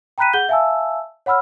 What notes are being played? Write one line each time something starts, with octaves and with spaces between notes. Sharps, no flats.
G5 A#5 B5 F#6 B6 D#7
G#4 F#5 G6 G7
E5 F5 G#5 A5 E6
C#5 F#5 B5 E6 F6